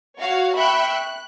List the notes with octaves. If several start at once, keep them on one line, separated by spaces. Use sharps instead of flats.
F#4 C#5 F5
E5 G5 B5 C#6 E6 F#6
F#6